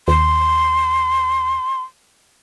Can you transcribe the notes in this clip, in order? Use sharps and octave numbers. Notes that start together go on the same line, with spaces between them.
D#2 C6